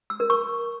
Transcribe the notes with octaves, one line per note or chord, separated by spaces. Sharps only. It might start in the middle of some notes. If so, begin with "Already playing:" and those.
E6
A#4
C#6